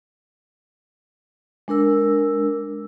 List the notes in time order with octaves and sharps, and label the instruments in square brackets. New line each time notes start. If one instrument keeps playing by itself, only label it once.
[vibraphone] G#3 D4 A#4 E6